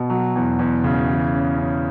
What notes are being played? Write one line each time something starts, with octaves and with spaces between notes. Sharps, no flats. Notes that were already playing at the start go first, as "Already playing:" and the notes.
Already playing: B2
F#3
E2
E2
C#3
E3
C#4
C#4